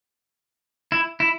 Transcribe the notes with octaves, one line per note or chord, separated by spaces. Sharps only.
E4
E4